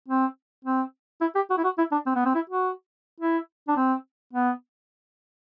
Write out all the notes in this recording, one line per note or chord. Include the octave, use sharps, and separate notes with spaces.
C4
C4
E4
G4
F#4
E4
F#4
E4
D4
C4
B3
C4
E4
F#4
E4
D4
C4
B3